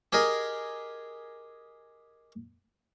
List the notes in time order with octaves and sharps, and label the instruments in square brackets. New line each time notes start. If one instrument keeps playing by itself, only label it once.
[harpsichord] G4 G#4 A#4 D#5